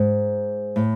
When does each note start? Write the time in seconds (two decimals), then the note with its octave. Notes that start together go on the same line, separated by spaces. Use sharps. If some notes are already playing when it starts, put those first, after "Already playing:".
Already playing: G#2
0.76 A2